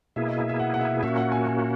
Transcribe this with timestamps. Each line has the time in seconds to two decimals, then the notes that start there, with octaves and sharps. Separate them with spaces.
0.16 B2 A#3 E4 G#4 E5
0.27 D#5
0.38 E5
0.49 E5
0.59 F#5
0.74 F#5
0.81 E5
1.03 A#2 A#3 C#4 F#4 E5
1.17 F#5
1.32 G#5
1.46 G#5